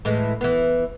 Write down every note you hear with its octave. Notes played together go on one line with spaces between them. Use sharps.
A2 E3 G#3
E3 B3